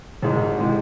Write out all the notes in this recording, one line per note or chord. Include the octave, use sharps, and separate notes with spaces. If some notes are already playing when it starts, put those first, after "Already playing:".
G#1 G#2 G#3
C3 E3 G#3